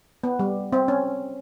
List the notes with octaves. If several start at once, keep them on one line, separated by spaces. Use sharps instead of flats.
B3
G3
C4
C#4